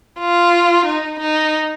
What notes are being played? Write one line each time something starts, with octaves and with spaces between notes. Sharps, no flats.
F4
D#4
D#4